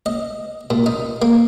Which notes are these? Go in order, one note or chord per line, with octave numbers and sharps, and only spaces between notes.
D#5
A#2
D#4
A#3